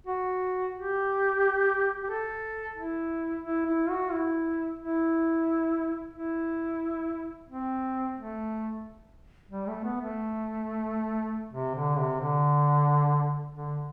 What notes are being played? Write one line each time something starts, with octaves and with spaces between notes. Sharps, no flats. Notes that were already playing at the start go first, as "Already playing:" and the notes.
F#4
G4
G4
A4
E4
E4
E4
F#4
E4
E4
E4
C4
A3
G3
A3
B3
A3
C3
D3
C3
D3
D3